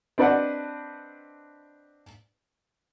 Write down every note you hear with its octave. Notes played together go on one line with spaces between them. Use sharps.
C4 D4 B4 D5 D#5 F#5